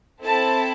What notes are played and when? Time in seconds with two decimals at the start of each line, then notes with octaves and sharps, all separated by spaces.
0.22 C4 E4 A4 A5